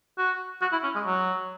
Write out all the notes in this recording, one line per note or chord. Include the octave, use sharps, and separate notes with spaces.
F#4
F#4
E4
C#4
G#3
F#3